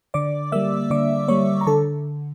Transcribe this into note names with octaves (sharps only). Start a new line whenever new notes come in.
D3 D5 D6
G3 A#3 E5 E6
D3 D5 D6
G3 A#3 C#5 C#6
A#5
D3 A4 A5